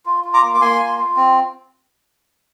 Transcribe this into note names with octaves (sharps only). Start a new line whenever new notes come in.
F4
F4
A#5 D6
A#3
D6
A#3 G#5 C6
F4
F4
C4